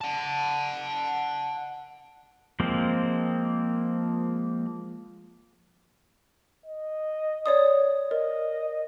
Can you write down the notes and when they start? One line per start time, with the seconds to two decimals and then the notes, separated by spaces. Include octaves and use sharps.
0.01 F#5 A5
2.60 F3 G#3 A#3 C4
6.66 D#5
7.46 C#5 D5 D#6
8.11 A#4 D#5